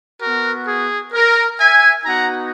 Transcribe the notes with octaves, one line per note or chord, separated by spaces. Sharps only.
B3 F#4 A#4
G#4
A#4
E5 G#5
B3 D#4 F#4 F#5 A#5